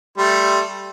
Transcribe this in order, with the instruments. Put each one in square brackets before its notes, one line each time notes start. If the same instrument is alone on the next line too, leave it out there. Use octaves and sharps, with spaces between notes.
[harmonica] G3 A3 C6